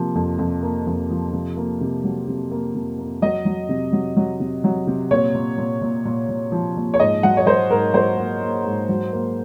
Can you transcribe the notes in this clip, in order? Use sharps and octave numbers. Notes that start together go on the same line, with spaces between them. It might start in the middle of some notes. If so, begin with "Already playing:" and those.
Already playing: C3 F3 A#3
F2
F2
A#3
F2
F3
C3
A#3
C3
F#3
C3
A#3
C3
A#3
F#3 D#5
F#3
C3
F#3
F#3
C3
F#3
C3
A#2 C#5
A#2
A#2
A#2
A#2
A#2
F3
A#2
C#5
G#2 D#5
F#3 F#5
C#5
F#3 C5
G#2 A#4
F#3 C5
A#3
A#3
G#2
F#3
A#3